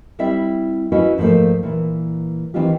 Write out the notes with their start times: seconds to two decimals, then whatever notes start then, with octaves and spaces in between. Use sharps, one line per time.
0.19 G3 C4 E4 D5 E5
0.92 C#4 E4 F#4 B4 D#5 F5
1.18 G#2 F3 F#3 A3 A#3
1.63 A#2 E3
2.54 D#3 E3 C4 D#4 F4 G4